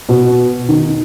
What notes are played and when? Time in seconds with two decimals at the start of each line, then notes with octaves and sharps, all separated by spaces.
0.09 B2
0.69 D#3